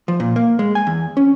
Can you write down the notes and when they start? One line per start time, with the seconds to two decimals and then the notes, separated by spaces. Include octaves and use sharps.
0.08 F3
0.20 A#2
0.36 A#3
0.59 G#3
0.75 G#5
0.87 E2
1.17 C#4